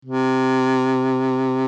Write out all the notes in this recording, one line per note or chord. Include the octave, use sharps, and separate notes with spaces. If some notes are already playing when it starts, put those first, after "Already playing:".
C3